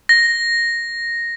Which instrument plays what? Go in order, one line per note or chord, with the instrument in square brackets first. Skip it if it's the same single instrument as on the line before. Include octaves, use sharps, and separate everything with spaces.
[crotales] A#6